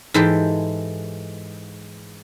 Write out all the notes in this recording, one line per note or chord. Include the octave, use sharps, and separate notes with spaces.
G#2 E3 G#3 G4 A4 G5